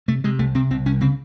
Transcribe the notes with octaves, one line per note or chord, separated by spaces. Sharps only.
C3 A3
C3 G#3
C2 A3
C3 C4
C2 C4
C2 C#4
C#3 C4